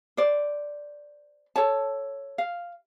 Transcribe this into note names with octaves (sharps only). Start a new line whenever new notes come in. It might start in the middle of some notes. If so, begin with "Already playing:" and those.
C5 D5
A4 C#5 A5
F5